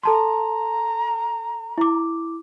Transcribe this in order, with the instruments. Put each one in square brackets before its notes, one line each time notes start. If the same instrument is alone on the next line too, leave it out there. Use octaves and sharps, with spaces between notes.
[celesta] A4 A5 C6 [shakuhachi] A#5
[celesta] E4 D6